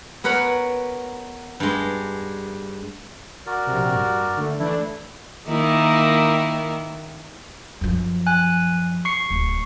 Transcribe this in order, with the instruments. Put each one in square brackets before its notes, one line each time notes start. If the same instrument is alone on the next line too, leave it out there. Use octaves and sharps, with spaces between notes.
[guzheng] B3 A#4 B4 C#5 F#5
G2 G#3
[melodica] F#4 A#4 D5
[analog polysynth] A#1 C3
G2
D3 A3
[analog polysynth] E3 A3 D4 [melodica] E4
[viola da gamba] D#3 A#3 E4
[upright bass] F#2 F3
[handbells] G#5 F#6
C#6 C7 C#7
[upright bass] D1